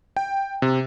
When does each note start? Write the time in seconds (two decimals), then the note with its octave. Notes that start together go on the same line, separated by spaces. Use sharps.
0.17 G5
0.62 C3